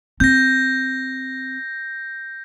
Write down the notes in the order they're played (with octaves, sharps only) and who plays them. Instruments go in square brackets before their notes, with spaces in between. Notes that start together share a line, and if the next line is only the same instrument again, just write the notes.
[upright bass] C4 [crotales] G6 A#6